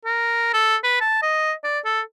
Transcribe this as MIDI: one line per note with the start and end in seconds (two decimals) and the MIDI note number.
0.05 0.52 70
0.53 0.76 69
0.84 0.99 71
1.00 1.20 81
1.22 1.53 75
1.64 1.79 74
1.85 2.01 69